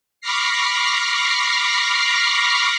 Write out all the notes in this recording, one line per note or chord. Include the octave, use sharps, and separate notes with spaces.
B5 C#6 D6 F6 A#6 C7